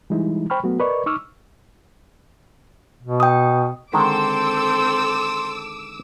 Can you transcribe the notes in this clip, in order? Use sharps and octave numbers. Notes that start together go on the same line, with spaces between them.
E3 G3 G#3 D#4 E4
C5 G5 B5 C#6 F6
F#3 A3 B3 F#4
A#4 B4 D5 D#5 C#6
D#4 C#6 D6 E6 F6
B2
G5 D#6
D3 D#3 G#3 C4 A4 C6 D6 E6